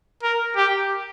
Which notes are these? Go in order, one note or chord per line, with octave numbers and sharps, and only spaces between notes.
A#4
G4